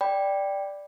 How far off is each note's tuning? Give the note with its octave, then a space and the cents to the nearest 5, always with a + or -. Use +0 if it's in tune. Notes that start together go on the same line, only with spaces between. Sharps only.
D5 +0 G5 +0 B5 +0